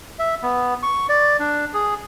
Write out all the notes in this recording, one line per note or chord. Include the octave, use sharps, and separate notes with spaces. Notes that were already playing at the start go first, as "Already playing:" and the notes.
E5
B3
C#6
D5
D4
G#4